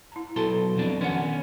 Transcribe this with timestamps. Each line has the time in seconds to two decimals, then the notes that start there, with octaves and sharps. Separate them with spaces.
0.12 E4 A5 A#5
0.36 B1 B2 F#4 A4 A5 A#5 C6
0.76 F2 B2 D4
1.01 D#3 B3 C#4 F#5